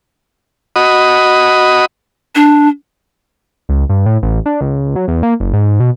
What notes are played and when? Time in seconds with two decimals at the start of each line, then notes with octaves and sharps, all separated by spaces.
0.76 F#4 D#5 B5 D#6
2.35 D4
3.69 C#2
3.89 G2
4.06 A2
4.22 A1
4.46 D4
4.61 C#2
4.96 F#3
5.08 E2
5.23 A#3
5.40 F#1
5.53 G#2
5.80 B2